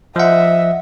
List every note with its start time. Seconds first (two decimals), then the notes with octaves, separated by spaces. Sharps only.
0.16 F3 D#5 E5 F#5